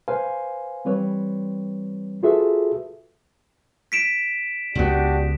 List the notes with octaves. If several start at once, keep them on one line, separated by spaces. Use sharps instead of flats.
B4 C5 F5 G#5
E3 G3 C4 B4 C#5
F4 F#4 G#4 A4 B4 E5
B6 D7 E7
C#2 B3 D4 F#4 G4